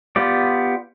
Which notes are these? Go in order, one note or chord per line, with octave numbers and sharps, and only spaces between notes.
B3 F4 G4 D5